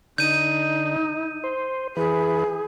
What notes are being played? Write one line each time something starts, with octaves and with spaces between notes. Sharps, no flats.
D3 D#4 G6 D#7
C5
E3 G#4 B4